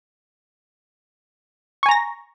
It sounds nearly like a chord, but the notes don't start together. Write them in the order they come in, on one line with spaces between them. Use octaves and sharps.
C#6 G#5 A#5 A#6